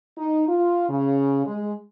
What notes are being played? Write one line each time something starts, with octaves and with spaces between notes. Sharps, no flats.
D#4
F4
C#3
G#3